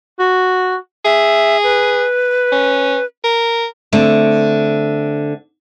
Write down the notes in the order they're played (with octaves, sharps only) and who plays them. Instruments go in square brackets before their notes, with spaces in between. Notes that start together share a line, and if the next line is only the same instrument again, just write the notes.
[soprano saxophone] F#4
[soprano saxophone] G#4 [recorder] E5
[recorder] B4
[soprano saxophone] C#4
A#4
[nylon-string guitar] D3 A3 C4